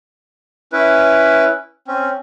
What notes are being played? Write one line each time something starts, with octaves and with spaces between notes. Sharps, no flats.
C#4 E4 B4
C4 C#4